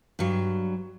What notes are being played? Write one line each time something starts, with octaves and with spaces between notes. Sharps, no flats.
G2 F#3